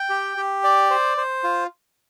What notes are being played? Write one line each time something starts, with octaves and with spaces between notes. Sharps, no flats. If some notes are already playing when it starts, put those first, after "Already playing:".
Already playing: G5
G4
G4
D5
C5
C5
F4